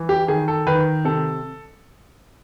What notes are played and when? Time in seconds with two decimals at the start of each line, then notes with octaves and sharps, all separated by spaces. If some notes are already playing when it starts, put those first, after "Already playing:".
Already playing: E3
0.09 G4
0.28 D#3 G#4
0.48 A4
0.67 D#3 B4
1.05 C3 A4